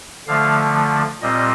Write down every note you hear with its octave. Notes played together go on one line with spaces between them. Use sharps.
D3 F3 A3 F5
A#2 G3 C4 D#5